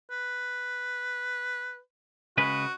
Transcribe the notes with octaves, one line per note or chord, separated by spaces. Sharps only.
B4
C#3 G#3 F#4 B4